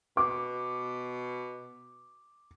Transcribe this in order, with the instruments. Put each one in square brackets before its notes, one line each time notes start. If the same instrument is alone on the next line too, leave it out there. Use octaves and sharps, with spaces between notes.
[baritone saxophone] B2 [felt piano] D6